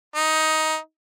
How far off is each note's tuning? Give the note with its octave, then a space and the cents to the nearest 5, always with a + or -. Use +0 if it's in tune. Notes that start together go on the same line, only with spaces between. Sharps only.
D#4 +15